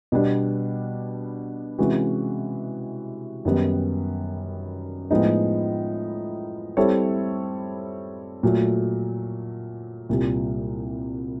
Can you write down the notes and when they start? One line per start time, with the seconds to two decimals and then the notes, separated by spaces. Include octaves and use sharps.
0.12 B2 G3 B3 D4
1.78 C3 E3 G#3 C#4 F#4
3.45 F#2 D#3 G3 B3
5.11 A2 F3 G#3 B3 D#4
6.77 G3 C4 E4 A4 C#5
8.43 A#2 F#3 A3
10.09 C2 A#2 G3